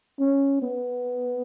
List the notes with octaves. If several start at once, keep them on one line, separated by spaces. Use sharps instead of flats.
C#4
B3